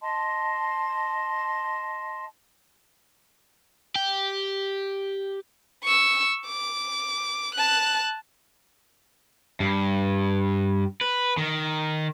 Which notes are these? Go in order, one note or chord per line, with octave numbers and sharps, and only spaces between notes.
D#5 A5 C6
G4
C#6 E6
D6
A5 F#6
G2
B4
D#3